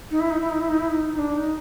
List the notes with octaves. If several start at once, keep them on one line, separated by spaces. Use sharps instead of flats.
D#4
E4
D#4
E4
D#4
E4
D#4
E4
D#4
D#4
D4
D#4